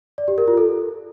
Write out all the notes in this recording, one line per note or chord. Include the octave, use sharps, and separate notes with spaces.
D5
G4
A#4
F4
A4